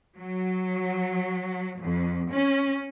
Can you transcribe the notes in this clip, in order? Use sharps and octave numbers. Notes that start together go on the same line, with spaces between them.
F#3
F2
C#4